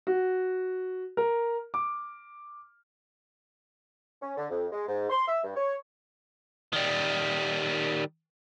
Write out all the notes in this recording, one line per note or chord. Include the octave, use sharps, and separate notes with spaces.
F#4
A#4
D6
C#4
D3
F2
G#3
G#2
C6
E5
G2
C#5
D#3 G3